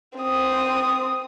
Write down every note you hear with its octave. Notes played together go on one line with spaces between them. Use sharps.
C4 D#6